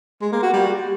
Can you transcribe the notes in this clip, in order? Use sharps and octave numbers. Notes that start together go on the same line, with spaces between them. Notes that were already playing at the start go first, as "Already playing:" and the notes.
G#3
A#3
F#4
G3